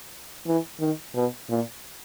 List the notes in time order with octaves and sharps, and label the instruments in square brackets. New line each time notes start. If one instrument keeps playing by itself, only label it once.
[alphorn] E3
D#3
B2
A#2